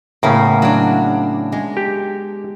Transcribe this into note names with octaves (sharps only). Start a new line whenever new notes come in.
A2 C#3 A#3 B3 C#4
F#3 D4
G#3
G4